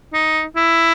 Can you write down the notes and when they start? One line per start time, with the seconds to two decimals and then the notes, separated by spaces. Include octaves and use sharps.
0.14 D#4
0.56 E4